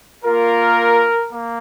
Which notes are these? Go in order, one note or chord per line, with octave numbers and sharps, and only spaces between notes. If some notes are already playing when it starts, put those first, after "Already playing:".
A#3 F4 A#4
A#3